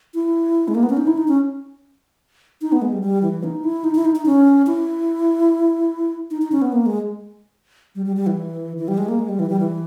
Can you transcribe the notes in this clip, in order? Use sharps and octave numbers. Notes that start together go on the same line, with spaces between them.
E4
G#3
A#3
B3
C#4
D#4
E4
D#4
C#4
D#4
B3
G#3
G3
G3
E3
D#4
E4
D#4
E4
D#4
D#4
C#4
E4
D#4
D#4
C#4
B3
A#3
G#3
G3
G3
G3
E3
E3
G3
G#3
A#3
G#3
G3
E3
G3
E3